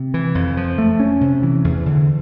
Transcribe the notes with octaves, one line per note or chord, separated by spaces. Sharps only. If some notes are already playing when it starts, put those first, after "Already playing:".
Already playing: C3
E3
F2
F3
A3
C#4
C3
E3
E2
D3